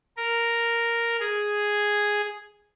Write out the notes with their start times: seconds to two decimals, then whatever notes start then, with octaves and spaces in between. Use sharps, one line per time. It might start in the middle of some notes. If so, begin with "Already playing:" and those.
0.17 A#4
1.19 G#4